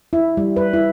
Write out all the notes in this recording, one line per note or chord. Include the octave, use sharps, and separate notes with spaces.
E4
G3
B4
E4